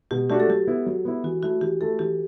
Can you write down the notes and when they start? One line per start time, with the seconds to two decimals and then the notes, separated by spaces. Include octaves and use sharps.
0.11 B2 G4
0.30 A3 D4 F#4 G4
0.40 A4
0.49 F#3 G4
0.67 B3 E4
0.86 F#3
1.05 B3 E4
1.24 E3 F#4
1.43 A3 E4 F#4
1.61 E3 G4
1.81 A3 E4 A4
1.99 E3 G4